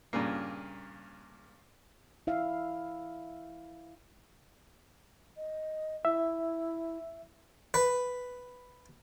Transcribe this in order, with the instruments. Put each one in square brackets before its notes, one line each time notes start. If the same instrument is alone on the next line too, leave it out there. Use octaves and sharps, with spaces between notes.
[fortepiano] G2 A#2 C#3 A#3
[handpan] E4 E5 F5
[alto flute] D#5
[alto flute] E4 [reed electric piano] E5
[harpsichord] B4